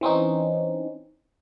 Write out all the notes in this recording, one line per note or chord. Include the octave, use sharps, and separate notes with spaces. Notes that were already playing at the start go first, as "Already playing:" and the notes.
E3 C4 C#4 D#4